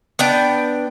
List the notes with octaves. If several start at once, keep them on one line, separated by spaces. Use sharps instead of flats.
B3 D4 G5